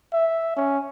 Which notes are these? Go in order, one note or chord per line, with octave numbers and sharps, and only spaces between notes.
E5
C#4